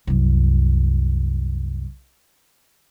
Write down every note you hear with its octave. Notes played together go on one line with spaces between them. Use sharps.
C2 F#2